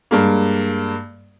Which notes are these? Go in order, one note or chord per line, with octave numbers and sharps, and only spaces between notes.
G2 G#3 A#3